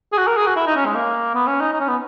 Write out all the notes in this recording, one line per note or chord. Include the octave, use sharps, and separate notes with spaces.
G#4
F#4
A#4
G#4
F#4
E4
D#4
C#4
G#3
A#3
B3
C#4
D#4
D#4
C#4
B3